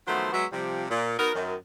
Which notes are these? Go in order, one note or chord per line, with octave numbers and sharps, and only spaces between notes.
D#3 F3 F#3 A3 B3 C5
F#3 G#3 B3 F#4 E5
C3 F3 G3
A#2
B3 D#4 F#4 A#4
F#2 D#3